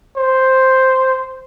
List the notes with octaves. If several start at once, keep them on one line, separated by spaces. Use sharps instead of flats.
C5